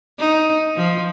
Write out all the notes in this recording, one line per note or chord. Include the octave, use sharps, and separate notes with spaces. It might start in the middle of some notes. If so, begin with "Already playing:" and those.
D#4
F3